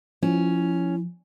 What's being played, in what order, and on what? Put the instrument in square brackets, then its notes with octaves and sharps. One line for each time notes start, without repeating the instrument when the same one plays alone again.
[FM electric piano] F3 [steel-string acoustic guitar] C#4 [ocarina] E4